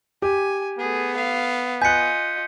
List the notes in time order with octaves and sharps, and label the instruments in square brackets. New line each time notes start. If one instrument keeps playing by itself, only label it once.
[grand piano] G4 [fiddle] G#5
[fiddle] A3 G#4 [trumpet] B3
[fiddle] F5
[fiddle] F4 D#5 [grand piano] G#5 F#6 [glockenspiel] G6 B6 C#7